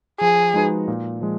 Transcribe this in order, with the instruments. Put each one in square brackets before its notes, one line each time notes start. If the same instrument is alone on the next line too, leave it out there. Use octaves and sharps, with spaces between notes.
[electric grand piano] F3 [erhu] G#4
[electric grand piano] G#3 D#4 F#4 B4
A#2
F3 G#3